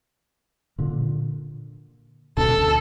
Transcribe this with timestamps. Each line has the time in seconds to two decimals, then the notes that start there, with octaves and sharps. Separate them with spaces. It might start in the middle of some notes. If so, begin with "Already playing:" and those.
0.78 A#2 D3
2.37 D2 B2 D4 A4